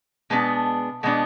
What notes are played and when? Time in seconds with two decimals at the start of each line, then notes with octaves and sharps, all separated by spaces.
0.30 B2 G#3 B3 D4
1.03 B2 G#3 B3 D4